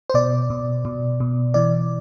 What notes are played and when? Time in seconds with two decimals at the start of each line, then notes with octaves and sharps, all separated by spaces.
0.10 C5
0.14 B2 D5
0.50 B2
0.85 B2
1.20 B2
1.54 E3 D5